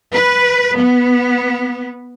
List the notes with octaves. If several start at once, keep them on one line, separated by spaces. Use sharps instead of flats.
B4
B3